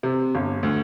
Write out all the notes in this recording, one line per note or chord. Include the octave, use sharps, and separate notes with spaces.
C3
G1
D2